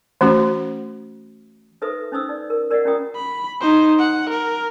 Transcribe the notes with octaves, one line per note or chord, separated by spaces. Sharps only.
E3 A3 C#4 F#4
D#4 A4 B4 C5 E5 D#6
C#4 D#4 C5 D#6 E6
D#4 D5
A#4
A#4 D5 D#5 F5 F#5
C#4 E4 F4 A#4 G5 D#6
B5
D#4 C5
F#5
A#4